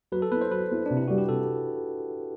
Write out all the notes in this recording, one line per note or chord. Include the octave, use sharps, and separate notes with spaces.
F#3 B4
A4
B3 E4 B4
C5
F#3 B4
B3 E4
C3 D4
E4
G3 D4 F#4
G4
C3 A4